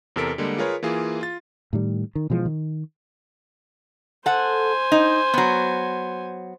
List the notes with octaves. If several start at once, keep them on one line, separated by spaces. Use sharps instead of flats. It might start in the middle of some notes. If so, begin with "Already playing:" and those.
E2 C3 A4 A#4 B6 D7
D3 G3 G#3 A#3
F4 G#4 A#4 B4 C#5
E3 A#3 F4 G#4
F4 A6
A2 D#3 G3
D#3
B2 E3 F3 G#3
D#3
A4 C5 F#5 G#5
D#4
F#3 B3